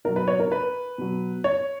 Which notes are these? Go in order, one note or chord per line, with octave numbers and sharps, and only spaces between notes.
B2 F#3 A#4
B4
C#5
A#4
B4
B2 F#3
C#5